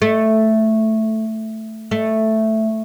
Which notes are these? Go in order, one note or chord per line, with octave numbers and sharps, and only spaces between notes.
A3
A3